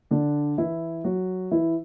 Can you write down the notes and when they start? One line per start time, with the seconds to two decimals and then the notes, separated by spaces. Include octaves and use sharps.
0.11 D3 D4
0.58 E3 E4
1.04 F#3 F#4
1.51 E3 E4